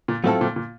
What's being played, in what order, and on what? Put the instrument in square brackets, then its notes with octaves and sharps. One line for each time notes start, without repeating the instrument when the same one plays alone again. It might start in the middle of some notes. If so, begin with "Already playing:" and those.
[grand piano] A#2
[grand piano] A2 [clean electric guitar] F#3 A3 C4 F4 A4
[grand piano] A#2
A#2